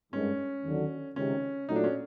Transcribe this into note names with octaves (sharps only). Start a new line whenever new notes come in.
G#1 G2 D#3 G#3 C#4
D#2 D3 F#3
C#2 C3 D#3 C#4
A#2 F#3 A3 D#4
D4
C#4